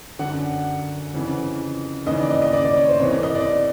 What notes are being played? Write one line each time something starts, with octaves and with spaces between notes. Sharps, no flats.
F#2 D3 F#5
F2 C#3 E3
D#2 C#3 E3 D#5
D5
D#5
D#5
D5
D5
C#5
C5
C2 C3 E3 C#5
D#5
D5